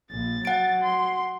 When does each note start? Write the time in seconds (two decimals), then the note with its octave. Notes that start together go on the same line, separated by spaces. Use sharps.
0.11 A#1 A6
0.45 F#3 F#5 D7
0.82 C6